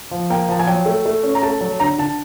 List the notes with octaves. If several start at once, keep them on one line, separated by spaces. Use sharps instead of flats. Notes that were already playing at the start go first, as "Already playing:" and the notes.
F3
A#3 G5
F3 A5
G#5
F#3 G5
A3
A3
C#4
A#5
A3 A5
F#3 A5
D3 A#5
D3 A5